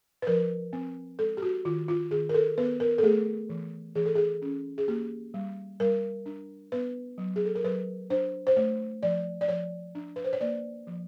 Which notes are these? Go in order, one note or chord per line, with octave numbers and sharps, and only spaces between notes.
B4
F3 A#4
C4
G#3 A4
G4
F#4
D#3 F4
F4
D#3 G#4
A#4
A4
B3 B4
A#4
A4
A3 G#4
E3
E3 G#4
A4
G#4
C#4
G#4
A#3 G4
G3
G3 A#4
D4
B3 B4
F#3
G#4
A4
A#4
F#3 B4
D4 C5
C5
A3 C#5
F3 D5
D5
F3 C#5
D4
B4
C5
C#5
A#3 D5
F3